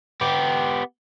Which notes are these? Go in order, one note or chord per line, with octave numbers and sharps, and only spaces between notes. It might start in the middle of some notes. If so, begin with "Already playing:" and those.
B3 G4